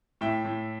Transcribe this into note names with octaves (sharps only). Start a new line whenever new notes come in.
A2 E5 G5
A2